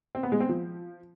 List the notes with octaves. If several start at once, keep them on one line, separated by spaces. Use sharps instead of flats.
C4
B3
G#3
C4
F3